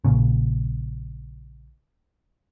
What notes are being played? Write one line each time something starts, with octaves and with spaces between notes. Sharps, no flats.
A#1 A#2 C#3